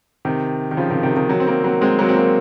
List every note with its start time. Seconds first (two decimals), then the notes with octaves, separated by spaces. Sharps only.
0.25 C3 D#3
0.71 D#3
0.77 C#3 F3
0.90 C3 D#3
1.03 C3 D#3
1.16 C3 D#3
1.29 D#3 F#3
1.40 C4
1.47 F#3 A#3
1.64 F#3 A#3
1.81 G#3 C4
1.99 F#3 A#3
2.09 C4
2.16 F#3 A#3